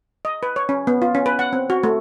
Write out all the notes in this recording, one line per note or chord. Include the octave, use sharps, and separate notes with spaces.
D#5
B4
C#5
C#4
B3
F4
C#4
B4
F#5
C4
F#4
A3